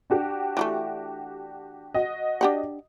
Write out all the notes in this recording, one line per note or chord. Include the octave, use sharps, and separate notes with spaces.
D4 F#4 G4
E3 F#3 A3
F#4 D#5
D4 G4 F#5